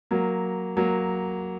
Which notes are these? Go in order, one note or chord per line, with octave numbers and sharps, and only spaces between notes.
F#3 A#3
F#3 A#3